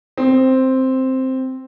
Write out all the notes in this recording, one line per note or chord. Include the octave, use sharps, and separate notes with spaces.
C4